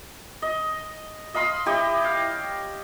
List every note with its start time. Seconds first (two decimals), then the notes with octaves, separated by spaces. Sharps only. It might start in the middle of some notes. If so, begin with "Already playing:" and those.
0.42 D#5
1.34 D#5 F5 B5 C6
1.66 E4 G4 C#5 D#5
2.04 F5